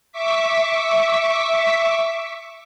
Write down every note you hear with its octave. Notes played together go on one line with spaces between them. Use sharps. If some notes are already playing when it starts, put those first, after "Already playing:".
E5 C#6 D6 B6